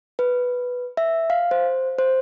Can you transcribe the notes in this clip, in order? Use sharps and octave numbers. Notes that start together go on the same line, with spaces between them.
B4
E5
F5
C5
C5